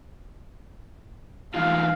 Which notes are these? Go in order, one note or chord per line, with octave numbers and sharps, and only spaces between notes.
E3 D#4 F4 F5